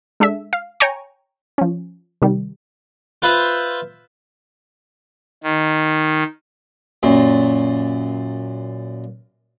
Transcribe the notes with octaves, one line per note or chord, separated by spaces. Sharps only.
G#3 D4 A4 E5
F5
C#5 G5 G#5 A#5 C#6
F3 C#4
C3 D#3 G3
F4 B4 C5 E5
D#3
F#2 A#2